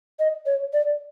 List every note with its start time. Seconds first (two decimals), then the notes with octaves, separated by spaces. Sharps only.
0.19 D#5
0.46 C#5
0.73 D5